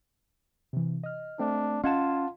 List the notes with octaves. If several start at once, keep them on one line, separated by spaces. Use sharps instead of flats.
C3 E3
D#5 F6
A3 C4 D4
C#4 F4 D#5 F5 F#5 A5 G#6 E7